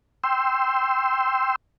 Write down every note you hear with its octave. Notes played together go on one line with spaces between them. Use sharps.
G5 C6 E6